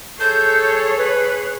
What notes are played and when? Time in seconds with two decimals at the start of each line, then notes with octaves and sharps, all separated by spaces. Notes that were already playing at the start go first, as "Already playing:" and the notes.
0.20 G#4 A4 C#5 G6
0.98 B4